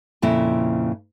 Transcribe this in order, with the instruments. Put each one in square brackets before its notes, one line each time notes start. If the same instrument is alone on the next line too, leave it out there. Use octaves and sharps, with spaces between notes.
[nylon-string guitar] F2 A#2 C#3 E4